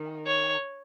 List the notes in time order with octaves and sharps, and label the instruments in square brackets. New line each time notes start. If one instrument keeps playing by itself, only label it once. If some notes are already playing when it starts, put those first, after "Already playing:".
Already playing: [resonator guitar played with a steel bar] D#3
[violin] C#5